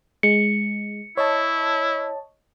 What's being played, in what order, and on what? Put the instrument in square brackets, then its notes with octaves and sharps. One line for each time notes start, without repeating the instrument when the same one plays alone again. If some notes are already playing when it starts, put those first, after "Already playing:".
[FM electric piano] G#3 [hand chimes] C#7
[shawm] E4 [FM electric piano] C#5 D#5 A5